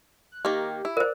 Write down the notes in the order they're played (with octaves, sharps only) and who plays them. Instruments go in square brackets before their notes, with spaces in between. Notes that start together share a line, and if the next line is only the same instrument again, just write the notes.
[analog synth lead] F#6
[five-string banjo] D#3 A#3 [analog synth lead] G4
[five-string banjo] E4
[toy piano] A#4 C5 [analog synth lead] D5